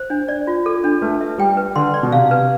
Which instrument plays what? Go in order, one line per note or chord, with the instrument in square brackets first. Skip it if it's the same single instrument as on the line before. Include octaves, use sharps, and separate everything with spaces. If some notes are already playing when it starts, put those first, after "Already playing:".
Already playing: [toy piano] C5
D4
D5
F4
A4
D4
[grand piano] A3 [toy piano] B4
[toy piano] E5
[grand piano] G3 [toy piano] G5
[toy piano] B4
[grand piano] D3 [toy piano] C6
[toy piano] D5
[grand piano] B2
[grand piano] C3 [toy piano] F5
[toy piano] B4